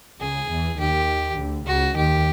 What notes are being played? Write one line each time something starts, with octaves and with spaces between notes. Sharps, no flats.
C#2 C#3 G#4
E2 E3
D#2 D#3 G4
D2 D3
C#2 C#3 F#4
D#2 D#3 G4